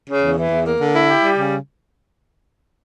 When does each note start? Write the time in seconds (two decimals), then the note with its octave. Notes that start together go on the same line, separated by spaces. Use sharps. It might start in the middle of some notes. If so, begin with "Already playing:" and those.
0.07 C#3
0.21 E2
0.36 E3
0.50 E2
0.64 A#3
0.78 D3
0.93 E4
1.06 G4
1.21 G3
1.35 C#3